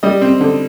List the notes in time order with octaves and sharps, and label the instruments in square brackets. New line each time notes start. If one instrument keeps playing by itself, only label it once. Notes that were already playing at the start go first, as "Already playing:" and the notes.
[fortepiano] G3 D#5
C4
D3